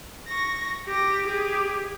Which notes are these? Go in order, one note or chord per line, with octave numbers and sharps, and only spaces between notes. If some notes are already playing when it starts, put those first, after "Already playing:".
C#6 A#6
G4 A#6
G4 G#4